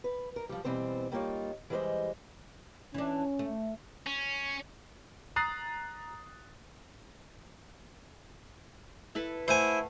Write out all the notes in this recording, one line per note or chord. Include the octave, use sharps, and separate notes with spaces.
B4
A#4
F3 G3
B2 E3 G3 C4 C5
G3 A#3 D#4 F4 C#5
E3 G3 G#3 A#4 C5 D#5
E3 C#4 D4
A3
C#4
A#5 D#6 F#6 A6 C7
E4 A4 B4
A3 E4 C5 F5 F#5 G#5